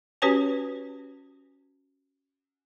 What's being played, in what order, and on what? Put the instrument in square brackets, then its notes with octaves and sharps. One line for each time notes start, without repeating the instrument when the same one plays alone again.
[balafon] C#4 F#4 G4 B4 C#5 G#5